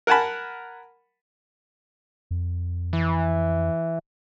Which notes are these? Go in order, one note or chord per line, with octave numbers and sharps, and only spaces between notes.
A#4 F#5 G#5 A5 B5
F2
E3